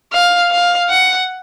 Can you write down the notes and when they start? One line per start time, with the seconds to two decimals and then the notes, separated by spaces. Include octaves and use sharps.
0.13 F5
0.51 F5
0.89 F#5